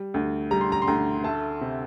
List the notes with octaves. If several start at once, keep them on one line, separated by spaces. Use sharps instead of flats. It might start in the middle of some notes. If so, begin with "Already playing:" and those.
Already playing: G3
D2
G3 A#5
C6
A#5
C6
D2 A#5
A3 A5
C3